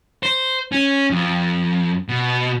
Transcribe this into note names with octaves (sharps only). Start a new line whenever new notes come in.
C5
C#4
F2
B2